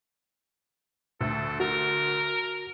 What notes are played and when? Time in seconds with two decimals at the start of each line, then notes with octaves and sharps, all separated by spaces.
1.21 D2 A4
1.60 F#4 A#4